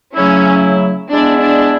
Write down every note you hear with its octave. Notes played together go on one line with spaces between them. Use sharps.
C#3 F#3 A3 C#4 E4
G#3 B3 D4 E4
D4